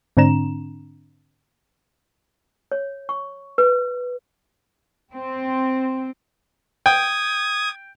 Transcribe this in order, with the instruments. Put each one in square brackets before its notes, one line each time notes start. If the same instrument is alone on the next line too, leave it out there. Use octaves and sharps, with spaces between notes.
[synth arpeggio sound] G#2 D3 C4 D4 A#5 E7
[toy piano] C#5
C#6
B4
[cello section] C4
[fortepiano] G5 [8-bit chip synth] D#6 G#6